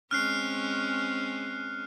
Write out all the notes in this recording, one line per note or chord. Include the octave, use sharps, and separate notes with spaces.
G#3 C4 C#4 F6 F#6 C7